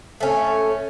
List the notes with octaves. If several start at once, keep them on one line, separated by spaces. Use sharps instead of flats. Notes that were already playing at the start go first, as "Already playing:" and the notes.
A3 C#4